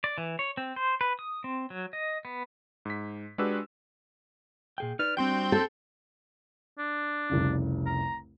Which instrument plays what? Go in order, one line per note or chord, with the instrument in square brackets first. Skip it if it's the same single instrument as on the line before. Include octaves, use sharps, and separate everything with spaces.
[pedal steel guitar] D5
E3
C#5
C4
C5
B4
D#6
C4
F#3
D#5
B3
[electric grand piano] G#2 B6
G#3 D4 F#4 G4 B4 E6
[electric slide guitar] A#2 G#4 G5
[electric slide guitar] D#4 B4 D5 [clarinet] F6
[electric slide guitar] G3 D4 F#4 [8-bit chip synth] C4 C6 G6 [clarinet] G5
[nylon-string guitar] A4
[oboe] D4
[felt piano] F1 C2 C#3
[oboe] A#5